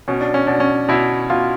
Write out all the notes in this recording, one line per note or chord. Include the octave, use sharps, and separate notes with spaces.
B2 C#4
D4
C#4
B2 D4
C#4
B2 E4
B2 F4